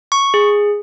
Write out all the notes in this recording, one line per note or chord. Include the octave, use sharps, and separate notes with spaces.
C#6
G#4